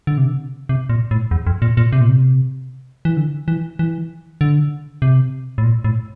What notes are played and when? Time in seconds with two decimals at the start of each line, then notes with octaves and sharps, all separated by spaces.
0.07 D3
0.18 C3
0.27 D3
0.69 C3
0.89 A#2
1.11 A2
1.31 E2
1.47 F2
1.62 A#2
1.77 A#2
1.92 C3
2.01 A#2
2.09 C3
3.05 E3
3.17 D3
3.48 E3
3.79 E3
4.41 D3
5.02 C3
5.58 A2
5.64 A#2
5.84 A2